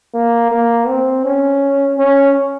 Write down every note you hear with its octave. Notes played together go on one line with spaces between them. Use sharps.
A#3
A#3
C4
C#4
C#4